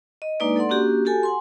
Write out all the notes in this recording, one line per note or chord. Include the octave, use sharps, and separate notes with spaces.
D#5
G#3 A#3 D4 D#4 B4 D5
A4 D5 F#5 C6
A#3 C#4 D4 F#4 G4
F#4 G4 A4 G#5 A5
F#5 G#5 C6